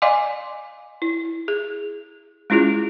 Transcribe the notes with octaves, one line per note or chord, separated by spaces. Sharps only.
D5 D#5 F5 G#5 C6 D6
E4
G#4
G#3 C#4 E4 F4 G#4